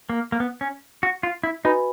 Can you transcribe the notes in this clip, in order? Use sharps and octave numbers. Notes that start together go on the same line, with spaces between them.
A#3
A#3
B3
C#4
F#4
F4
E4
D#4 F#4 B4 D#5 G#5 B5